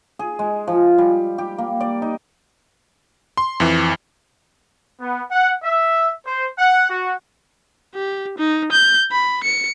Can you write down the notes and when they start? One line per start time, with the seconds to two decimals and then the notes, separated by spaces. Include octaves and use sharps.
0.19 G#4
0.39 G#3
0.67 F3
0.98 G3
1.38 G4
1.58 A#3
1.80 D5
2.02 D#4
3.37 C6
3.60 F2 E3
4.99 B3
5.31 F#5
5.63 E5
6.25 C5
6.57 F#5
6.88 F#4
7.95 G4
8.38 D#4
8.72 G6
9.11 B5
9.43 C#7